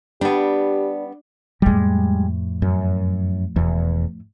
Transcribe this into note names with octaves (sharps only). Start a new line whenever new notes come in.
G3 B3 D4 G4
F2 A2 G3 G#3
F#2
E1 E2